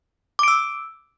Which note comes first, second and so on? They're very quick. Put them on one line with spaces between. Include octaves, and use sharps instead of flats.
D6 D7 E6